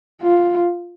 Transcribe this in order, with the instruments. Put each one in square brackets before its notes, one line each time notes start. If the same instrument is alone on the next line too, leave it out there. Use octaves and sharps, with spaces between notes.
[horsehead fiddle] F4